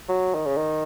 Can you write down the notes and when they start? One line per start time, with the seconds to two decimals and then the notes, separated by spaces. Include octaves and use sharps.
0.09 F#3
0.35 D#3
0.46 C#3
0.57 D#3